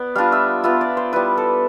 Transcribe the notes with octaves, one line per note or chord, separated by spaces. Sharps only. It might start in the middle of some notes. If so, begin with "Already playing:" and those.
Already playing: B3 D5
G3 D4 F4 F5
E5
B3 F4 E5
D5
C5
G3 B3 E4 B4
A4